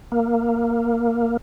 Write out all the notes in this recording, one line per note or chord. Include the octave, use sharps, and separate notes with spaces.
A#3